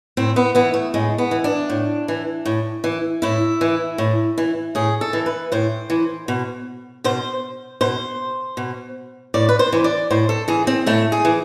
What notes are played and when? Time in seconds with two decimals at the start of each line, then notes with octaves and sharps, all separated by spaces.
0.17 A2 C4
0.36 B3
0.55 E3 B3
0.74 A3
0.94 A2 G#3
1.18 B3
1.31 E3
1.44 D4
1.70 A2
2.08 E3
2.46 A2
2.84 E3
3.22 A2 E4
3.61 E3
3.98 A2
4.38 E3
4.75 A2 G#4
5.01 A4
5.13 E3
5.26 B4
5.52 A2 C5
5.90 E3
6.28 B2
7.04 B2 C5
7.81 B2 C5
8.57 B2
9.34 A2 D5
9.49 B4
9.59 C5
9.72 E3
9.84 D5
10.11 A2 C5
10.29 A4
10.48 E3 G#4
10.67 C4
10.86 A2 A3
11.12 G#4
11.25 E3